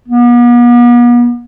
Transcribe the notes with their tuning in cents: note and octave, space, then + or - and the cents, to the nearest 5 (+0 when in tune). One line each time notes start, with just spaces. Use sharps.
B3 -45